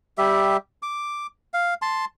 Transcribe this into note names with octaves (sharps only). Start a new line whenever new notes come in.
G3 G4 E5
D6
F5
A5 C6